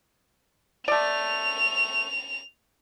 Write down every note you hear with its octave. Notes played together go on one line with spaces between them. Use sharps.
A3 D5 F7